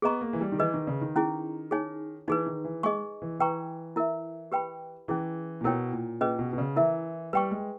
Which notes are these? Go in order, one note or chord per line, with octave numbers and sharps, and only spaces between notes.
B3 G#4 D#5 A#5 C#6
A#3
E3
G3
D#3
E3 G#4 B4 D#5
D#3
C#3
D#3
C#4 E4 G#4
D#4 G#4 C#5 G#5
E3 D#4 G#4 B4
D#3
E3
G#3 G#4 D#5 G#5 C#6
E3
E3 B4 G5 A#5 C#6
E4 A#4 E5
G4 B4 G5 B5
E3 C#4 E4 G#4
A#2
B2 E4 A#4 C#5 G5
A#2
A#2 C#4 G#4 B4 D#5
B2
B2
C#3
E3 E4 A#4 E5
G3 B4 G5 C#6
G#3